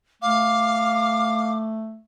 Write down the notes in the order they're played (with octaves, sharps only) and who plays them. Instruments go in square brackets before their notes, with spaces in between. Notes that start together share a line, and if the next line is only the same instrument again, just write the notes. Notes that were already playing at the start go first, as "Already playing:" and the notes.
[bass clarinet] A3 [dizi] F5 [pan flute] D6